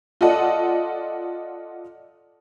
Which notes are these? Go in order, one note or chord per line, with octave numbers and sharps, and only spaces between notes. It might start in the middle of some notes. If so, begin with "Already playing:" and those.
F4 A4 D5 D#5 F#5